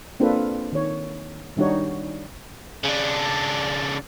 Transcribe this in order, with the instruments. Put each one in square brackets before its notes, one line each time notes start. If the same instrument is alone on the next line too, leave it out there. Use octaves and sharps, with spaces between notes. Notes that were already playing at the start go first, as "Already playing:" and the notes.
[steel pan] A#3 C4 D4 F4 A4 B4
D#3 C#5
D#3 G3 D4 D#4 F#4 C#5
[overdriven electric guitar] C#3 D4